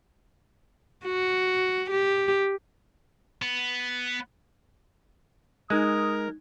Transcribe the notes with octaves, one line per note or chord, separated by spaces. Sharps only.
F#4
G4
B3
G#3 D#4 A#4 D#6 F#6 G#6